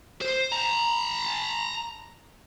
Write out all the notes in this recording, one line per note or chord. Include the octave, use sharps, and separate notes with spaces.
C5
A5 A#5